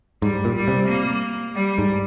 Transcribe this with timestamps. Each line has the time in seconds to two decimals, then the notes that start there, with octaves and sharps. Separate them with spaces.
0.22 G#2 G3
0.45 A#2
0.56 G3
0.68 C3
0.89 A#3
1.56 G3
1.78 G#2